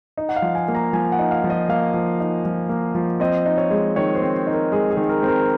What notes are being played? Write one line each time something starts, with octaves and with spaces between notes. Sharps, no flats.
D#4
F#5
F5
F3
G#5
A#3
A#5
F3 G#5
F#5
D#4
F5
F3
D#5
A#3 F5
F3
D#4
F3
A#3
F3
C4 D#5
D#4
C#5
G#3
D#3 C#5
C5
C4
D#4
A#4
G#3 G#4
G#4
D#3
A#4
C4
A#4